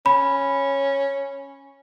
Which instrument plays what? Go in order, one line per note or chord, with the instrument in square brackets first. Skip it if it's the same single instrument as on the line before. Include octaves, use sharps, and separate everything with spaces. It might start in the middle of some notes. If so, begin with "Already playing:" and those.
[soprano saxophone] C#4 [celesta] B5